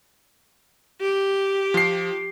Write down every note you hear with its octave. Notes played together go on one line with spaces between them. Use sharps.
G4
F3 C7